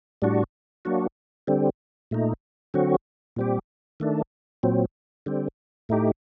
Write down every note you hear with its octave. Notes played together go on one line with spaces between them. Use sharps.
A2 G3 D4 F#4
F#3 A#3 D4 F#4
D3 G3 C4
A#2 A3 D#4
D3 F#3 C4 F#4
A#2 G3 C4 G4
D#3 A3 D4
A#2 F#3 C4
D3 G3 C4
A2 A3 D#4 G4